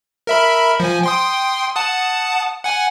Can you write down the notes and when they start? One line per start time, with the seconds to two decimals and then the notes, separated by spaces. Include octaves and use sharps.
0.27 A#4 E5 B5
0.80 F3 G#5
1.03 G5 C6 D#6
1.76 F#5 A5 D#6
2.64 F#5 G#5